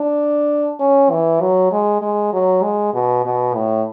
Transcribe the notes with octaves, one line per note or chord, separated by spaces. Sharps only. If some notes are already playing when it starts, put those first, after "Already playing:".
Already playing: D4
C#4
E3
F#3
G#3
G#3
F#3
G#3
B2
B2
A2